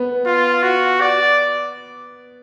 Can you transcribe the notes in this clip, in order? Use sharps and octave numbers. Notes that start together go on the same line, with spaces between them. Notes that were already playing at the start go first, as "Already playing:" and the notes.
Already playing: B3
F4
F#4
D5